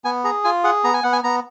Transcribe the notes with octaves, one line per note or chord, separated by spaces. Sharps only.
B3 G#5
G#4 A#5
F4 G#5
G#4 F#5
B3 A#5
G#5
B3 F#5
G#5
B3 A#5